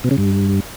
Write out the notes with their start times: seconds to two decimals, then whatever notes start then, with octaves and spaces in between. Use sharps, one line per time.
0.04 B2
0.11 C#3
0.18 G2